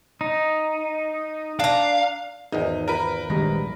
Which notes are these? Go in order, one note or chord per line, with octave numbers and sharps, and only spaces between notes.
D#4
D4 F5 A#5
G#1 E2 D#4
A#4 B4
A#1 D#3 G3 G#3 A#6